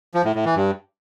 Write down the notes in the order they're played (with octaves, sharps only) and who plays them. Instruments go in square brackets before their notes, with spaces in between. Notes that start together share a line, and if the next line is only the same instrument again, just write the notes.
[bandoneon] F3
A2
A2
E3
G2